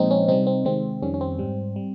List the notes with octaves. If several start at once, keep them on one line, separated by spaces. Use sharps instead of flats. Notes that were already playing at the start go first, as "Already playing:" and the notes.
Already playing: A#2 F3 G#3 C4 D#4
C#4
C3 G3 C4 D#4
C4
C3 D#3 G#3 C4
F2 D#3 G3 C#4
C#4
C4
G#2 G3
G3